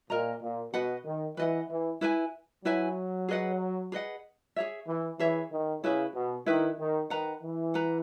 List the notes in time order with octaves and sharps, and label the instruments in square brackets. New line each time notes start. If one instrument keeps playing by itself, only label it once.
[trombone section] A#2 [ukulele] A#4 D#5 A#5
[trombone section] A#2
[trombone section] B2 [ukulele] B4 D#5 F#5
[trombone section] D#3
[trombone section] E3 [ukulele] B4 D#5 F#5
[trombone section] E3
[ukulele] E4 B4 E5 G#5
[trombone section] F#3 [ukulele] E4 B4 E5 G#5
[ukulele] G#4 B4 D#5 F#5
G#4 B4 D#5 F#5
G#4 C#5 E5
[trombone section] E3
[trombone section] E3 [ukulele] G#4 C#5 E5
[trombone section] D#3
[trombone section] C#3 [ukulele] E4 B4 E5
[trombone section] B2
[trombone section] D#3 [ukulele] E4 B4 E5
[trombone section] D#3
[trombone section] D#3 [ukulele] B4 F#5 A#5
[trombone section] E3
[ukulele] B4 F#5 A#5